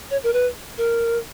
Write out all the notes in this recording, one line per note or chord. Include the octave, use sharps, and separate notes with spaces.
C#5
A#4
B4
A#4